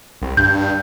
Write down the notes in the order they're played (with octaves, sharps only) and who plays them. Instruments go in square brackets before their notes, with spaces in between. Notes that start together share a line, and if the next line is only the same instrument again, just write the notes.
[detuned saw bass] C2
[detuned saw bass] G2 [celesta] G6